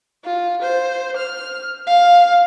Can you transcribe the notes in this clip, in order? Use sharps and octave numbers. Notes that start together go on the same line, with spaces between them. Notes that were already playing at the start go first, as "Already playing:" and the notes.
F4
C5
F6
F5